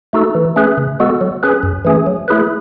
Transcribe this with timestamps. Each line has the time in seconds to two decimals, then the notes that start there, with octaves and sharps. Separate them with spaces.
0.13 A3 D#4 F#4 A4
0.35 E3
0.56 A3 C#4 G#4 B4
0.77 C#3
1.00 G#3 B3 F#4 A4
1.21 F#3
1.43 C#4 G#4 B4
1.63 F#2
1.85 E3 A3 C#4 G#4
2.07 F#3
2.28 A3 E4 G#4 B4